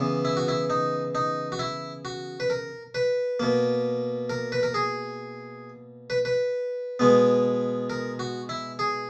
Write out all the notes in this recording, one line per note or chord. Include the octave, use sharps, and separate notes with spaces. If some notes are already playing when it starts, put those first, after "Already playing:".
Already playing: C#3 E3 B3
E4
F#4
E4
D#4
D#4
F#4
E4
F#4
B4
A#4
B4
B2 A#3
A#4
B4
A#4
G#4
B4
B4
B2 G#3 B3
A#4
F#4
E4
G#4